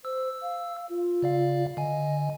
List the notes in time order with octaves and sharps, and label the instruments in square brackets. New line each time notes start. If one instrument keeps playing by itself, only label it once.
[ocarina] C5 [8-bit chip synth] E6
[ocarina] F5
F4
[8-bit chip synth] C#3 D5 F5
[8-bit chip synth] D3 G#5 [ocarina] D#5